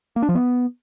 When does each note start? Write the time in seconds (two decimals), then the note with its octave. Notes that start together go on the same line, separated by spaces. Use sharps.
0.16 A#3
0.22 D4
0.29 F3
0.35 B3